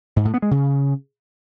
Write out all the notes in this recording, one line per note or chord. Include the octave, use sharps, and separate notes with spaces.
G#2
A2
B3
G#3
C#3